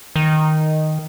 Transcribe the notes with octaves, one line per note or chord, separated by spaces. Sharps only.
D#3